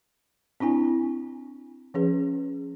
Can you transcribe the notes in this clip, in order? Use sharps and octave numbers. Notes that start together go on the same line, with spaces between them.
C4 D4 E4 G#5
F3 C#4 G#4 B4